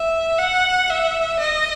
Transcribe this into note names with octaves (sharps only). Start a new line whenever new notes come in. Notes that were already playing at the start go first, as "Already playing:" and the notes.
Already playing: E5
F#5
E5
D#5